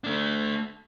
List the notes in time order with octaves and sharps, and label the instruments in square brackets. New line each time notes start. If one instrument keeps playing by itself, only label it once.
[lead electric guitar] A3 D4